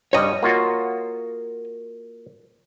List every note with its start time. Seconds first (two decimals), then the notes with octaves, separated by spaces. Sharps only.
0.13 G2 G3 C#5 D#5
0.43 A#3 F4 F#4